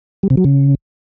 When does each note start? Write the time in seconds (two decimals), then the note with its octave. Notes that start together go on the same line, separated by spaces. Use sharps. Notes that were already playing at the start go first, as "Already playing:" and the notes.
0.23 G3
0.30 C3
0.37 F#3
0.44 C#3